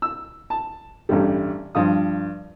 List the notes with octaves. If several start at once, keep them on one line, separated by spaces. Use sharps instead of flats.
E6
A5
A1 G2 G3
G2 F3 F4 D#6